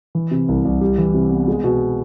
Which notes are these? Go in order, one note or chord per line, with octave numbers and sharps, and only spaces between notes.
E3
C3
C2
C2
G3
E3
C3
B3
G#3
B2